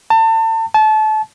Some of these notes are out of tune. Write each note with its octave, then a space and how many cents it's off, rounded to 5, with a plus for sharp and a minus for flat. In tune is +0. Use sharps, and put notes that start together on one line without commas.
A5 +30
A5 -30